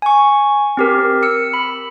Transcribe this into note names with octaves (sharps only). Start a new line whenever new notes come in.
G#5 C#6
C4 G4 A#4
E6 C#7
B5